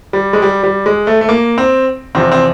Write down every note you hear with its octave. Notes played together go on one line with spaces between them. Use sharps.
G3
G#3
G3
G3
G#3
A3
A3
A#3
C4
E2 C3 F3 C4
C4